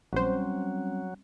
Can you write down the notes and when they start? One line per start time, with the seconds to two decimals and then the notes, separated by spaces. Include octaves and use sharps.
0.13 A#1 F#3 G3 C4 C#4 C5